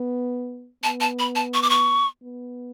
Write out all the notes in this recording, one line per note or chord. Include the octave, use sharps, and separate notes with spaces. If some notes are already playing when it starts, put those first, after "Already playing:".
Already playing: B3
B3 A5
A5
B5
A5
C#6
D6
C#6
B3